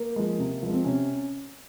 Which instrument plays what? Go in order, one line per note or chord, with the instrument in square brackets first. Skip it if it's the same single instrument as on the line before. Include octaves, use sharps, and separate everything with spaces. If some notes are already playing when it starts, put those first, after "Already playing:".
Already playing: [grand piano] A#3
F3 G#3
C3
F3 G#3
C4
C3 C#4